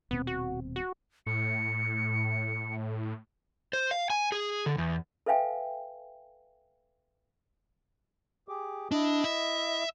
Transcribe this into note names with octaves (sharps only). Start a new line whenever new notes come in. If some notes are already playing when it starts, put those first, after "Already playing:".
D#1 B2 B3 C4
F#4
F#4
A2 C#7
C5
F5
G#5
G#4
D3
E2
A4 B4 E5 F5 G5 G#5
G4 G#4 D6
D4 E4 D#5
E5